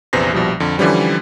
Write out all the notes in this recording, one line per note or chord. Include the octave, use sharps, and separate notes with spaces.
A#1 E2 C3 B4 C5 A#6
A#1 B2 F3 G3
F2 D3
D3 E3 F3 G3 C#4